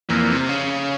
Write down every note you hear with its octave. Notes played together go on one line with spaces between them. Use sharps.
F2 A#2 E3 A#3
C3
C#3